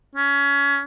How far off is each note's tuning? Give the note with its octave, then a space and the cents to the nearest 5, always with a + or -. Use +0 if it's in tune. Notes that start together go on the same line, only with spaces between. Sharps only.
C#4 +25